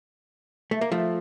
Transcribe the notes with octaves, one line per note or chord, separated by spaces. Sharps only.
A3
A#3
F3 A3